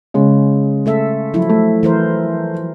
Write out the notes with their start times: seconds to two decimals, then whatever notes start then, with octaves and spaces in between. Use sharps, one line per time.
0.14 C#3 G#3
0.86 A3 A4 E5
1.34 F3 F#3 E4
1.49 A3
1.83 E3 A#4 C5